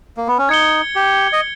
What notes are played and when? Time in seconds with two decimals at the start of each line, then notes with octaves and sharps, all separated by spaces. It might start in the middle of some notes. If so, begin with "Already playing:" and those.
0.17 A#3
0.27 B3
0.38 C#4
0.49 D#4 G#6 C#7 G7
0.95 G4
1.33 D#5